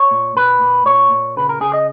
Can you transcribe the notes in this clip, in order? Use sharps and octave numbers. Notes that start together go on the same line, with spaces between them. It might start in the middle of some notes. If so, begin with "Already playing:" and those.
Already playing: C#5
A#2
A#2 B4
A#2
A#2 C#5
A#2
C#3 B4
A#4
C#3 G#4
D#5